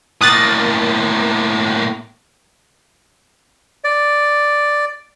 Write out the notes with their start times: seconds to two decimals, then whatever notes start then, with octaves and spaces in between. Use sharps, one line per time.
0.21 A2 A#3 D#6 F#6 A6
3.84 D5